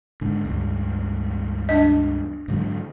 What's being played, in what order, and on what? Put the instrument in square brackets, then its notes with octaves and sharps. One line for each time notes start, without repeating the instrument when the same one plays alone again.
[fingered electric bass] G#2 D3
C#2 G2
[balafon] D4 D#5
[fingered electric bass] G#2 D3 F#3